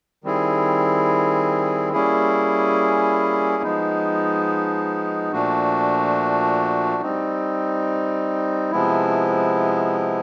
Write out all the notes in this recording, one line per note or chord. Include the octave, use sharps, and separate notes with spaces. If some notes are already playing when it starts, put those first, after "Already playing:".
D#3 G3 C4 E4 G#4
G3 A#3 C#4 E4 G#4
F3 G#3 B3 D#4
A#2 F3 A3 D4 F#4
G3 C4 D#4
C3 F3 G#3 B3 E4